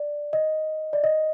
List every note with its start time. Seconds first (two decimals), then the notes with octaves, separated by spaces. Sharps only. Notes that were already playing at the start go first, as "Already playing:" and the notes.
Already playing: D5
0.33 D#5
0.93 D5
1.04 D#5